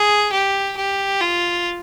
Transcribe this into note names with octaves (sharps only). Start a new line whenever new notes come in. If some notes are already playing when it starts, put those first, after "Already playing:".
Already playing: G#4
G4
G4
F4